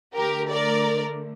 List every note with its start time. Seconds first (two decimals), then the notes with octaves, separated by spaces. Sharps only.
0.15 D3 A3 G4 A#4
0.50 A#4 D5